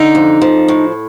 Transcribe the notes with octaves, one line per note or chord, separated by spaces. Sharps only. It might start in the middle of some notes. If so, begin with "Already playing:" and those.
Already playing: D3 D#4
F2
F3
A2